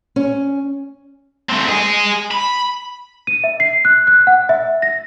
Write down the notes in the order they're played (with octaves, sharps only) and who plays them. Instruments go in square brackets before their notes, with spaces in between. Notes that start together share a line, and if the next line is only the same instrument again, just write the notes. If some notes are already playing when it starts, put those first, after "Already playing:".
[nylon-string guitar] C#4
[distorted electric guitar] A3 C4
G#4 D#5
B5
[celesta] D#7
E5
C7
F#6
F#6
F#5
E5
A#6